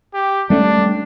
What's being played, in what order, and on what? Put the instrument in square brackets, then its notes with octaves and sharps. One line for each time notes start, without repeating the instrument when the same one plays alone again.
[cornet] G4
[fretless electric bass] G3 A3 C#4 [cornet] D4